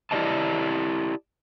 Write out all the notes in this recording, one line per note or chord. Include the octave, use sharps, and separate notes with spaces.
E4 F4 G4 D5 D#5 A5